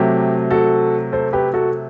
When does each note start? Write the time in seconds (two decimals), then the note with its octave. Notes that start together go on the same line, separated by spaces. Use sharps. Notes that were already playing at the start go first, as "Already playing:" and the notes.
Already playing: C3 F#3 A3 G4
0.51 F#4 A4
1.12 A4 C5
1.33 G4 B4
1.54 F#4 A4